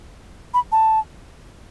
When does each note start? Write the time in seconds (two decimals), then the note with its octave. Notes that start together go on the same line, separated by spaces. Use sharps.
0.54 B5
0.72 A5